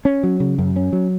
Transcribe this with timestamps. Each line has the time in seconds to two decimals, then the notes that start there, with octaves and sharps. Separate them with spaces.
0.05 C#4
0.23 F#3
0.40 C#3
0.58 F#2
0.76 C#4
0.93 F#3